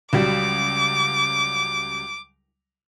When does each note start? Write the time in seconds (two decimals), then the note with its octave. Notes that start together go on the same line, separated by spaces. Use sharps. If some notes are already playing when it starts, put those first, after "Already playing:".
0.13 C#2 F#3 G3 D6